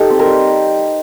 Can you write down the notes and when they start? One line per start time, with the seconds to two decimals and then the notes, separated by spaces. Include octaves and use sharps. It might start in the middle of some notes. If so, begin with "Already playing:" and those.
Already playing: D#4 G4 A4
0.10 C4
0.19 A#4
0.27 G3